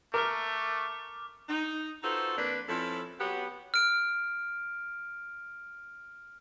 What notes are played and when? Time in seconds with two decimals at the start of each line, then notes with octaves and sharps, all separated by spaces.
0.14 A3 A#4 D6 F6
1.49 D#4
2.03 D#4 F4 F#4 A4 B4 C5
2.38 F2 A#3 D4 B4
2.68 F2 F3 C#4 E4 A4
3.20 F#3 B3 G4
3.74 F6 D7